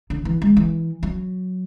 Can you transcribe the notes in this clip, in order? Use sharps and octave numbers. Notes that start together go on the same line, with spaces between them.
D3
E3
G#3
E3
F#3